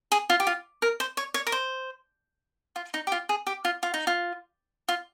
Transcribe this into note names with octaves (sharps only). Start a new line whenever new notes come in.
G#4
F4
G4
F4
A#4
C5
C#5
C#5
A#4
C5
F4
D#4
G4
F4
G#4
G4
F4
F4
D#4
F4
F4